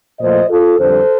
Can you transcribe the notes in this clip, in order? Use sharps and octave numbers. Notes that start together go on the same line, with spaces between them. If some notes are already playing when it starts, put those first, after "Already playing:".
A#2 F3 A3 C5 D#5
F4 A4
F2 D3 G3 A4 C5